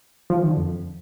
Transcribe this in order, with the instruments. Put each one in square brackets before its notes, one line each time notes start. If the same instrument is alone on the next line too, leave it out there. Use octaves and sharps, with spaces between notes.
[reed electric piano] F3
E3
D#3
D3
F2